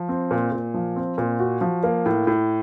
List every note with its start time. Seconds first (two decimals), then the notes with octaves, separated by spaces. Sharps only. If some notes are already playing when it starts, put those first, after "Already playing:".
Already playing: F3
0.09 C4
0.31 A#2
0.52 A#2
0.74 F3
0.96 C4
1.18 A#2
1.39 F#4
1.61 F3
1.84 A#3
2.06 A2
2.27 A2